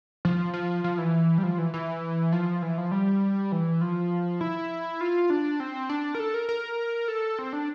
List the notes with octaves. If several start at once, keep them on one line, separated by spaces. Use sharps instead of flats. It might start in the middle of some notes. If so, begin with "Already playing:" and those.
F3
F3
F3
E3
G3
F3
E3
E3
F3
E3
F3
G3
E3
F3
E4
F4
D4
C4
D4
A#4
A4
A#4
A#4
A4
C4
D4